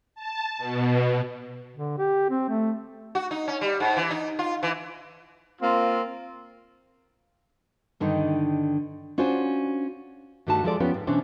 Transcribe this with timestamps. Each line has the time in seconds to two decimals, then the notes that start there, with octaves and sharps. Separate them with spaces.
0.15 A5
0.58 B2
1.77 D3
1.98 G4
2.30 C4
2.49 A3
3.15 F#4
3.31 D#4
3.48 C#4
3.61 G3
3.80 G#2
3.97 E3
4.11 D#4
4.39 F4
4.63 E3
5.62 A#3 C4 F4
8.00 G2 D3 D#3 D#4
9.18 C#4 D4 F4 F#4 C5
10.47 G2 D#3 G3 A3 F#4 A5
10.64 F3 G#3 A4 D5
10.80 F2 F3 B3 C#4 G4 B4
10.94 G#2
11.07 B2 E3 C#4 D4 C5